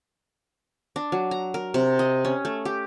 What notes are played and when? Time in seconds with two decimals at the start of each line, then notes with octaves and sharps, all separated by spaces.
0.96 D4
1.12 F#3
1.31 A#5
1.54 A#4
1.74 C3
1.99 D#5
2.25 C#4
2.45 A3
2.65 G4